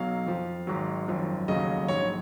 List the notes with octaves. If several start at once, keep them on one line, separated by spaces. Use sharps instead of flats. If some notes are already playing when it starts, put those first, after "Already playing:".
Already playing: B1 B2 F#3 F5
F2 F3
G#1 G#2 F#3
G#1 F#2 F3
F1 D#2 C#3 F#3 D#5
A#1 G#2 F#3 C#5